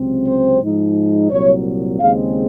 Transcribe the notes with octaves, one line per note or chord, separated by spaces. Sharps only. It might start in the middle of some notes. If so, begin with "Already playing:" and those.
Already playing: C#2 C3 F#3 C4
C5
G#2 F3 G#3 D#4
C2 A#2 F#3 C#5
D#2 C#3 G#3 C4 F5